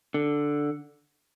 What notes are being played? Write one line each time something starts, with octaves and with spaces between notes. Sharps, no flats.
D3